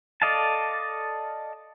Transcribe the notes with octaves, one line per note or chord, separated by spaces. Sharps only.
A4 D5 D#5 F5 A5